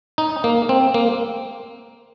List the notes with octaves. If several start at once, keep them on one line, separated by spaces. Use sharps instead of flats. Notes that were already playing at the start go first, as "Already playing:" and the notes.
D#4
A#3
C4
A#3